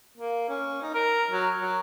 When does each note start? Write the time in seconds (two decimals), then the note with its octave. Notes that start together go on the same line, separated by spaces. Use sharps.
0.18 A#3
0.49 C#4
0.82 D#4
0.94 A#4
1.31 F#3
1.60 F#3